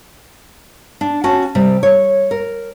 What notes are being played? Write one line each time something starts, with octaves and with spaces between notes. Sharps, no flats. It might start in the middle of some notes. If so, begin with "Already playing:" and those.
D4
C#4 F#4 A5
C3 G3
C#5
A#4